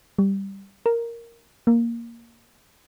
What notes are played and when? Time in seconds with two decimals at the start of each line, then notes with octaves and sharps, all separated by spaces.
0.18 G3
0.86 A#4
1.67 A#3